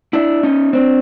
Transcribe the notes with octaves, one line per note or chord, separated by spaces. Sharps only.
D4 E4
C#4 D#4
C4 D4